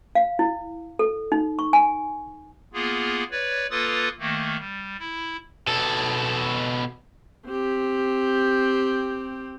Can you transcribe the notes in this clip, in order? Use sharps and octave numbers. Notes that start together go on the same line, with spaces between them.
F5
E4
A4
D#4
C#6
G#5
A#3 B3 F4 G#4
B4 C#5 D5
A#3 F4 A4 B4 D#6 A6
D#3 A3 A#3
G3
E4
B2 A4
C4 G4